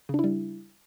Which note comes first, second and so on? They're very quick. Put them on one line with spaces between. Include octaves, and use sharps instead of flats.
C#3 D4 E4 G3